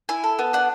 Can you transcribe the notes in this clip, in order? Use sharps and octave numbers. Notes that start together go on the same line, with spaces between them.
E4 G#5
A4
B3
D4 F#5